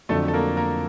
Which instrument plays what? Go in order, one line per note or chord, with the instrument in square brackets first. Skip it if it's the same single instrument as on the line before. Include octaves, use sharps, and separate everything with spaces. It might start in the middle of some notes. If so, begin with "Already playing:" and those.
[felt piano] F2 D3 F#3 [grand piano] A3 A4
[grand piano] A4
A#3 A#4
A#3 A#4